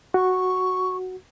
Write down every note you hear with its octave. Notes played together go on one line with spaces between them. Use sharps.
F#4 C#6